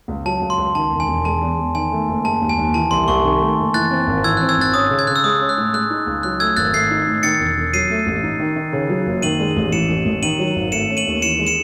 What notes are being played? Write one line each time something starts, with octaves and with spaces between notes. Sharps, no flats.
C#2
F#3 A5
C#2
C6
C#2
D#3 A5
E1
G#5
E1
G#3 A5
E2
E2
D#3 G#5
A3
F#1
G#3 A5
D#2
G#5
D#2
E3 A5
C2 C6
C2 C#6
D#3
A3
F#1
E3 F#6 A6
C4
G#1
E3 E6 G#6
F#6
C4
E6 G#6
G#1 F#6 A6
C#4 D#6
C#3
G#6
C#3 F#6
E6
G#3 D#6
C#4
F#6
A2
G#3 F#6
D#4
C#2
F#3 F#6
A3 E6 G#6
G#1 F#6 A6
A3 G#6 C7
D#4
A2
D#3 A6 C#7
E1
E1
F#3 C7 D#7
A3
A1
D#4
D#3
D#3
C#3
F#3
F#1
D#3 D#7 F#7
G#3
A1
E3 C#7 E7
A1
A1
D#3 D#7 F#7
F#3
G#1
A3 C#7 E7
C#4
D#7 F#7
D#2
E3 C#7 E7
G#3
C#7 E7